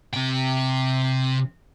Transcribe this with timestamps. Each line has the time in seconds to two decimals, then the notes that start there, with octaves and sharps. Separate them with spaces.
0.13 C3 G5